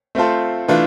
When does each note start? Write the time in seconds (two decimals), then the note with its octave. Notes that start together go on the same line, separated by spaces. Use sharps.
0.15 A3 C4 F4 A4 C5
0.68 E3 A3 D4 F4